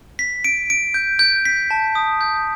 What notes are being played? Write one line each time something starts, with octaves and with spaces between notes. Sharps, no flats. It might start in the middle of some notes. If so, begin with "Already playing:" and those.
B6
D7
D7
G6
G6
B6
A5
D#6
G6